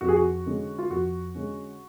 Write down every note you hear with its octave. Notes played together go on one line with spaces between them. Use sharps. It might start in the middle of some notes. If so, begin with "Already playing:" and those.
F2 F#4
G#4
F#4
D3 G#3 C#4
F4
F2 F#4
D3 G#3 C#4